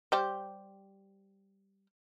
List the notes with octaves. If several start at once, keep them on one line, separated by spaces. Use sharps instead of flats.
G3 G4 C5